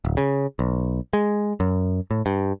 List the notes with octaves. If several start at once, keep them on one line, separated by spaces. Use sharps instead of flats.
D1
C#3
B1
G#3
F#2
A2
G2